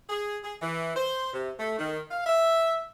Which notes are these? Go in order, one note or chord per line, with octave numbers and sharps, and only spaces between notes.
G#4
G#4
E3
C5
C3
A3
D#3
F5
E5